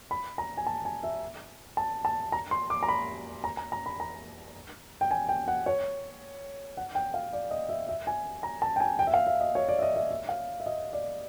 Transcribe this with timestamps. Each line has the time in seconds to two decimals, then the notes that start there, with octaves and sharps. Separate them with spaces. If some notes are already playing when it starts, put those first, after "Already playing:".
0.11 B5
0.38 A#5
0.57 G#5
0.67 A5
0.85 G#5
1.03 E5
1.77 A5
2.05 A5
2.32 A#5
2.51 C6
2.70 D6
2.83 A#5
2.88 B5
3.44 A#5
3.57 A#5
3.72 A#5
3.86 B5
4.00 A#5
5.01 G5
5.11 G#5
5.29 G5
5.48 F#5
5.66 C#5
6.77 F#5
6.95 G5
7.14 F5
7.33 D5
7.51 D#5
7.69 E5
7.88 E5
8.07 G#5
8.43 A#5
8.62 A5
8.76 G5
8.80 G#5
8.99 G5
9.07 E5
9.14 F5
9.27 E5
9.40 D#5
9.55 C#5
9.69 D5
9.79 E5
9.82 D#5
9.96 E5
10.11 E5
10.29 F5
10.60 E5
10.66 D#5
10.93 D5